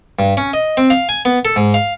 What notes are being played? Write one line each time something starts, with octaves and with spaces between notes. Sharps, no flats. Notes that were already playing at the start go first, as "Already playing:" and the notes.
G2
C#4
D#5
C4
F5
G#5
B3
A4
G#2
F5